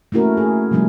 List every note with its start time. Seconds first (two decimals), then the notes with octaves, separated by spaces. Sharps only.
0.12 A3 A#3 C#4 E4 F#4 A#4
0.37 G#4
0.71 C3 F3 G3 A3 B3 D4